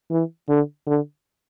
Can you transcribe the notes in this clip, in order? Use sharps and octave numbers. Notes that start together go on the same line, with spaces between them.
E3
D3
D3